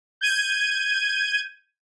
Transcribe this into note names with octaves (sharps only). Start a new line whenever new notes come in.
G6 G#6 D#7